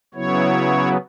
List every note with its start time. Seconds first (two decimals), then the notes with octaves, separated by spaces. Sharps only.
0.14 C#3 F#3 B3 E4 C#5